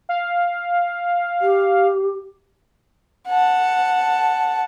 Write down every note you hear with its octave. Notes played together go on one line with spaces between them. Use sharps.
F5
G4
F#5 A5